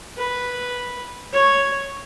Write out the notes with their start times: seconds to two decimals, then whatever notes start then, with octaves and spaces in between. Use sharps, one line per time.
0.18 B4
1.33 C#5